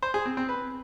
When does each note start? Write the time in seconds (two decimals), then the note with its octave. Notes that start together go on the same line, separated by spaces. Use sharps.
0.03 C5
0.14 G#4
0.26 C4
0.37 C4
0.49 B4